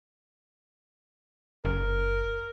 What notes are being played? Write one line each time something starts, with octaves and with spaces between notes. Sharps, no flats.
F#1 A#4